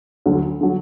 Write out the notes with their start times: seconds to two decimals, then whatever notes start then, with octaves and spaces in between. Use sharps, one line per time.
0.26 D2 D3 F#3
0.61 D3 F#3